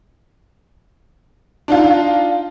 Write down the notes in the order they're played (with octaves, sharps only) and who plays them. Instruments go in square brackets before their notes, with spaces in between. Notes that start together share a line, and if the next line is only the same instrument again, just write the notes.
[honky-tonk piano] D4 D#4 F4